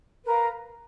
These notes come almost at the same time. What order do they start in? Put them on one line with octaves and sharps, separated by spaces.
B4 A#4 A#5 F5